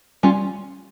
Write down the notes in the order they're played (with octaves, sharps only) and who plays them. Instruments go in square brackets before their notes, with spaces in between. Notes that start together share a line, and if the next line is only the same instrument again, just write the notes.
[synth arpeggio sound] G3 [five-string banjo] C#4 F4